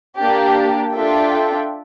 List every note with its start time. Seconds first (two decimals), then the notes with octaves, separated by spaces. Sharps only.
0.18 A#3 D4 G4
0.93 D4 F4 A4 E5 G5